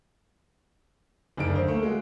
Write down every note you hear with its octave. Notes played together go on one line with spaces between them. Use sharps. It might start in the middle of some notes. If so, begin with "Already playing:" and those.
F#1 D2 D4 D#4 D7
D2 C5
A3 A#3
G#3 F#4